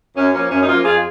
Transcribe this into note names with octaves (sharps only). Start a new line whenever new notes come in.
F#2 C#4
F3 A#3 C#4
F#2 C#4
D#4
F3 A#3 C#4 F4
F2 F4 G#4